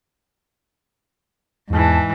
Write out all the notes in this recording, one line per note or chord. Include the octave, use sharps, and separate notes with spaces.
E2 G#2 E3 A5